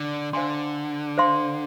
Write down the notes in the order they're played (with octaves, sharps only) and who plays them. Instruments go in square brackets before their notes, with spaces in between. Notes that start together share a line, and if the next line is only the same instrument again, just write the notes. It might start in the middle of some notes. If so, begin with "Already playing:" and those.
Already playing: [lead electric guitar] D3
[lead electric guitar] D3 [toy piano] C5 F5 G#5 C6
[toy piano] C5 F5 C6